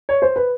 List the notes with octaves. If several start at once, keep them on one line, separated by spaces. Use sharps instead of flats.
C#5
C5
B4